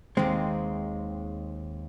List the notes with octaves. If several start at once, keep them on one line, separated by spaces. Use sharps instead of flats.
D#2 D#3 G#3 C4